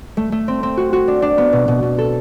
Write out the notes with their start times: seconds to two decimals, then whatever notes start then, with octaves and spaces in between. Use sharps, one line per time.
0.17 A3
0.32 A3
0.48 C4
0.63 C4
0.77 F#4
0.93 F#4
1.08 D4
1.22 D4
1.38 B3
1.53 B2
1.68 B2
1.83 B2
1.98 A4